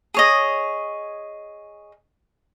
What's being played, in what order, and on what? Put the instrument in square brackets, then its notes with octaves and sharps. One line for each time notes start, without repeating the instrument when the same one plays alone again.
[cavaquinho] G#4 C#5 D#5